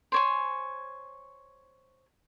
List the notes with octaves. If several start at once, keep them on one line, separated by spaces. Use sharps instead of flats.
C5 C#5 G#5